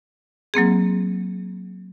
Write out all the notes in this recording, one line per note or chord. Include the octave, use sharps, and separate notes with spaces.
F#3 A#3 C4 G#4